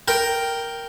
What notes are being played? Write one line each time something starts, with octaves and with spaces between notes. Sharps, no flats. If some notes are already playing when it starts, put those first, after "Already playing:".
A#4 G5